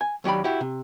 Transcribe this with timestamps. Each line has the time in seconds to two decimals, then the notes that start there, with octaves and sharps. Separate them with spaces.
0.01 G#5
0.24 D#2 F#3 G4 D5 B5
0.44 E4 F#4 G4
0.61 C3